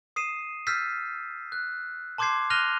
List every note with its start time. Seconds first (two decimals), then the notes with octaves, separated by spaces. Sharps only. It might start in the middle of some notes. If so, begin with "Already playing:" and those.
0.16 D#6 C7 D#7 E7
0.67 E6 F6 G6 A6 B6 C7
1.52 F#6
2.18 A5 C6 D6 G6 G#6 C7
2.50 F6 F#6 A#6 D#7 F7 G7